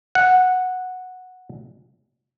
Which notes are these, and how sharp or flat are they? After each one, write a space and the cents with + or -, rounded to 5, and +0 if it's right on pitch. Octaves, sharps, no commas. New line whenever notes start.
F#5 -5